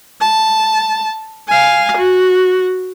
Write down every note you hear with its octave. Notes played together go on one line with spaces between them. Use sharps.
A5
F5 G#5
F#4